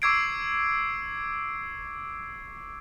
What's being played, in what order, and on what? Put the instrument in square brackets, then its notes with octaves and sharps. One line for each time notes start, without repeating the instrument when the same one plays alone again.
[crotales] C#6 D6 E6 G#6 C7 D7